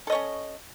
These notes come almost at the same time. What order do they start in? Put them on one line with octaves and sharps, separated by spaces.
A4 D#5 C#5 C#4